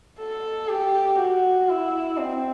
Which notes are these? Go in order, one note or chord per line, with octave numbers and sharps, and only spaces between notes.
A4
G4
F#4
E4
C4